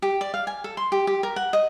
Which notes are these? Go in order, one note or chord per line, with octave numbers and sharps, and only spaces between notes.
G4
D5
F5
G#5
A4
C6
G4
G4
A#4
F#5
D#5